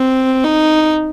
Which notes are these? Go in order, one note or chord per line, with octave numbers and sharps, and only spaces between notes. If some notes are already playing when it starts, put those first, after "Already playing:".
Already playing: C4
D#4